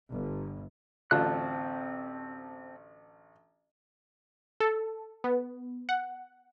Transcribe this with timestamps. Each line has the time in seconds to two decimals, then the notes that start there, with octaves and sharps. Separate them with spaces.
0.11 G1
1.11 A1 D2 C4 F4 A5 F#6
4.60 A4
5.24 B3
5.89 F#5